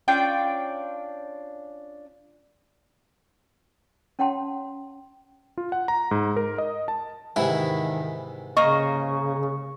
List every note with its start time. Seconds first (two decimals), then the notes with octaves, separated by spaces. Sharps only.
0.08 C#4 D4 F4 G5
4.19 C#4 C#5 F#5 G5 A5 C6
5.58 F4
5.72 F#5
5.88 A#5
6.11 G#2
6.37 A#4
6.58 D#5
6.88 A5
7.36 G#2 C3 D#3 E3 E4
8.57 C#3 A#3 D#5 C#6